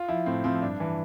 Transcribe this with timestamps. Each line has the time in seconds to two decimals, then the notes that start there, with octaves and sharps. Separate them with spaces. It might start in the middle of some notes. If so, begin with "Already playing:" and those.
Already playing: F4
0.08 F3 E4
0.26 A2 C4
0.44 F3 C4
0.62 G2 D4
0.80 E3